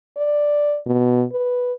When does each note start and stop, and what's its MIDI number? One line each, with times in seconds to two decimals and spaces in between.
0.17 0.78 74
0.86 1.24 47
1.32 1.73 71